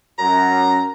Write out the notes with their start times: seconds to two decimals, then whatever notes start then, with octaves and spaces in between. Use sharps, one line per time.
0.19 F#2 A#5